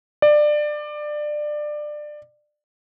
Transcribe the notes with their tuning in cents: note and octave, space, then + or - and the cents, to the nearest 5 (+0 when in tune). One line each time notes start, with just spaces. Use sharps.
D5 +20